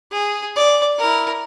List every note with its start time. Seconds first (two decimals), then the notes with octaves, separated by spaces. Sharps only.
0.11 G#4
0.56 D5
0.98 E4 A#4